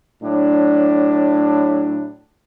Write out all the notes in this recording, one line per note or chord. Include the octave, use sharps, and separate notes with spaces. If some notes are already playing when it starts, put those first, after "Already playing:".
A2 F#3 D4